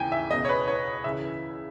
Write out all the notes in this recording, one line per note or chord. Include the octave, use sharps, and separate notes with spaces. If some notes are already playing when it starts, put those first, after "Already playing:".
Already playing: D#2 C#3 E3 G5 G#5
E5
C#2 B2 D#5
C#5
B4
C#5
C#2 C#3 E3 E5